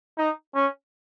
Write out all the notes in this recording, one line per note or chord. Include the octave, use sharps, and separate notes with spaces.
D#4
C#4